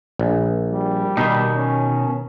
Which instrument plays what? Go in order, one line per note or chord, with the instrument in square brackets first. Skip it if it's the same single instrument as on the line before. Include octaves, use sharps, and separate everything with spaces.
[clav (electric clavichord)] A#1
[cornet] G3
[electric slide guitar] B2 D#3 [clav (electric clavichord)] D#4
[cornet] C#4